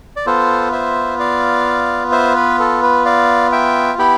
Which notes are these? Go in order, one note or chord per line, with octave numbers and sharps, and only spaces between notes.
D5
B3 F4 A4 C5
C5 E5
D5 F5
C5 E5
B4
A4
B4
D5 F5
E5 G5
B3 E4 G4 G5 B5